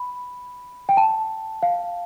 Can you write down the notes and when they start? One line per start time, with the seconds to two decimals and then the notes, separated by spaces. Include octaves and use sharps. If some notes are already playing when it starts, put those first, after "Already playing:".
Already playing: B5
0.89 G5
0.97 A5
1.63 F5